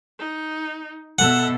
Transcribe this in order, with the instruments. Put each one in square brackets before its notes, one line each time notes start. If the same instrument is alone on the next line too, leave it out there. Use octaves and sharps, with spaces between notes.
[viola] D#4
[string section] B2 [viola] A4 E5 [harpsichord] F#5